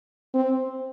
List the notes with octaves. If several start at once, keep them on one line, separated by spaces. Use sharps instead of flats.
C4